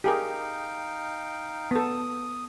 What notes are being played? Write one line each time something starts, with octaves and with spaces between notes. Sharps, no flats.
D#4 G4 G#4 A#4 F5 G5
B3 A4 D#6